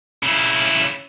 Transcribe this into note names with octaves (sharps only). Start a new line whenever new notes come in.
C#3 E4